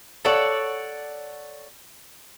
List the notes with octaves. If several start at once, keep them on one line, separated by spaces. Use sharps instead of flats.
A4 C#5 D5 F#5